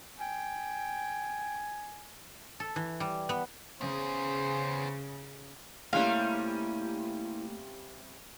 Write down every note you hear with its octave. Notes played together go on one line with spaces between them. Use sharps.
G5 G#5
A4
E3
G3
B3
C#3 B3 G#4 C5
C3 G3 A3 A#3 C#4 E4 F5